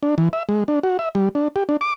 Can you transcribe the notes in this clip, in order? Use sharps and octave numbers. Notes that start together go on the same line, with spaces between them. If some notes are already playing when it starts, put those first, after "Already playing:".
D4
E3
E5
G#3
D4
F#4
E5
G3
D4
G4
D4
D6